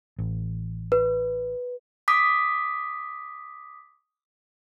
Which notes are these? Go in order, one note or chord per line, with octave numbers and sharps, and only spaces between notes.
A1
B4
D6 D#6 B6